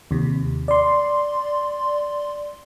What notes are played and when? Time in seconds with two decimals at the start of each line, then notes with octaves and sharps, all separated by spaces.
0.11 D#2 C3
0.68 D5 C6